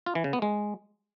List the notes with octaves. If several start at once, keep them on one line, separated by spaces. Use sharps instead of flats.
F4
E3
C#3
B3
G#3